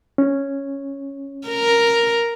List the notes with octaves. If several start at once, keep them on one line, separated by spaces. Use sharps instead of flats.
C#4
A#4